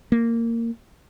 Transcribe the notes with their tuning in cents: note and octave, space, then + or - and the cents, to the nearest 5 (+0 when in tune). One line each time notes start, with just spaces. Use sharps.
A#3 -15